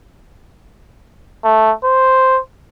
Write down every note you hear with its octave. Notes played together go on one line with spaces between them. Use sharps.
A3
C5